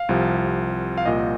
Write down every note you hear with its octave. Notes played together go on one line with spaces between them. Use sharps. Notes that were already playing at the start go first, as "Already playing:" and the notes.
Already playing: F5
C2 C3 F3
F5
C2 A#2 F3 D#5